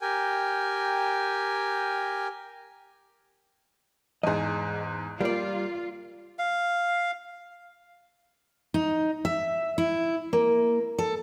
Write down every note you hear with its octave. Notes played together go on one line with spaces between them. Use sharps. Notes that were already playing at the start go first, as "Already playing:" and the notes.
G4 A#4 G5 G#5
E2 G#2 G#4 D#5
G3 A#3 F4 D5
F5
D#4
E5
E4
A#3
A4